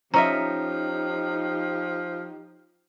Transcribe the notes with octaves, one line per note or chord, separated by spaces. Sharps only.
F3 C#4 D#4 G4 D#5 E5 A#5